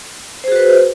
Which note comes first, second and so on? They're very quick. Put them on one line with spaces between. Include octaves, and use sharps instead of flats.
C5 G#4 F#4 B4